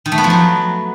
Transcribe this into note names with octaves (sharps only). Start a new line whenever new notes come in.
D#3
A3
B3
F3
F#3